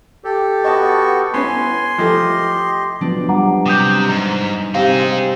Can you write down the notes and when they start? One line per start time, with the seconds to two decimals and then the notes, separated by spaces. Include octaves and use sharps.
0.24 G4 A4
0.64 B3 F#4 D#5 A5 C#6
1.33 B3 C#4 E4 G#5 C6
1.98 F3 A3 G4 D#5
3.01 F3 F#3 B3 D4
3.29 G3 F#5 A#5 D6
3.66 C3 D4 A#5 D6 D#6 G6
4.08 G#2
4.75 C3 D#4 G#4 F5